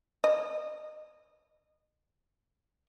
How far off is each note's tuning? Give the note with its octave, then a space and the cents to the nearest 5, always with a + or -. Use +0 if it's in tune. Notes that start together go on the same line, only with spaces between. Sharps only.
D#5 -30